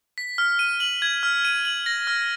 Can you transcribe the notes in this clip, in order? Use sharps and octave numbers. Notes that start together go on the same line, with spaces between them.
B6
F6
D#7
F#7
G#6
F6
D#7
F#7
A#6
F6